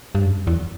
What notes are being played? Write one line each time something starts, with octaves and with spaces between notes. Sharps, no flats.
G2
F#2
E2